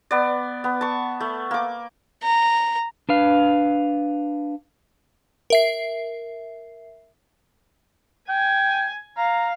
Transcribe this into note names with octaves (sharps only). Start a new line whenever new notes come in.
B3 D5
B3
A5 C#6
A3
A#3 D6
A#5
D4 B4 F5
A#4 E5 C7
G5 G#5
F5 A#5